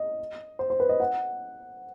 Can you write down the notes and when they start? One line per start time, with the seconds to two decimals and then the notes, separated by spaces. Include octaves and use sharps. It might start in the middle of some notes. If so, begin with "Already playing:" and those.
Already playing: D#5
0.59 C5
0.70 C5
0.80 B4
0.89 D#5
1.00 F#5